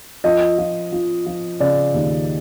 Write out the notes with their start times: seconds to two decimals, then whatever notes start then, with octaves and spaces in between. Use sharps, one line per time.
0.24 F3 D#5
0.58 F3
0.92 F3
1.26 F3
1.60 C#3 D5
1.94 D#2